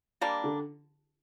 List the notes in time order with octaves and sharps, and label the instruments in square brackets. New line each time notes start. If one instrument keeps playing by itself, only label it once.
[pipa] G3 A#3 D4
[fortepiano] D3